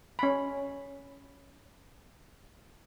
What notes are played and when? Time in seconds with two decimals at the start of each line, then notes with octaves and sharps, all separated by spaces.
0.19 C#4 B5